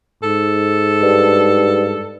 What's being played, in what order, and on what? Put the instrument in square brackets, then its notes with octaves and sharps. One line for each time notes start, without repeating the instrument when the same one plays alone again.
[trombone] G#2 [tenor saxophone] A4
[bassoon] G2